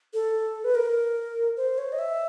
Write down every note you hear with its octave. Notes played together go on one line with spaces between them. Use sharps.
A4
B4
A#4
C5
C#5
D#5
E5